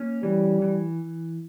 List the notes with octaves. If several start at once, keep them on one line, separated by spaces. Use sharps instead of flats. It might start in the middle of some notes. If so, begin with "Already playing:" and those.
Already playing: A#3 C#4
E3 G3
E3